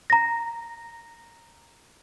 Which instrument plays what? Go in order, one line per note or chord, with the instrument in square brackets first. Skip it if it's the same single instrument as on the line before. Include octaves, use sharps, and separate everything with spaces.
[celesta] A#5 A#6